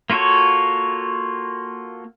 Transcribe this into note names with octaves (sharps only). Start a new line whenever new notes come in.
A#3 F4 F#4 A4 C#5